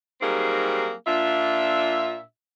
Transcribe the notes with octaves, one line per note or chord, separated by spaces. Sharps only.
F#3 G3 A#3 C4 D#4 G#4
A#2 D4 F4 E5